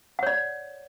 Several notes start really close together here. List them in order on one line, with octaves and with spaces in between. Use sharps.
F#5 C#5 D5